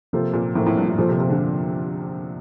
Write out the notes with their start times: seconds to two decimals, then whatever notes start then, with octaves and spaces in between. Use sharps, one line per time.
0.13 C3 F3 A#3 F4 A4 C5
0.33 A#2
0.55 A2 F3 A#3 F4 A4 C5
0.66 A2
0.77 G2
0.88 A2
0.98 A#2 F3 A#3 F4 A4 C5
1.09 C3
1.20 C3
1.30 D3